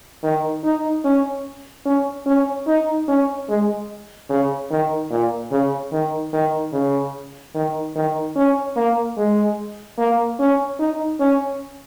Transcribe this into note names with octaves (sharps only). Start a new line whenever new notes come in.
D#3
D#4
C#4
C#4
C#4
D#4
C#4
G#3
C#3
D#3
A#2
C#3
D#3
D#3
C#3
D#3
D#3
C#4
A#3
G#3
A#3
C#4
D#4
C#4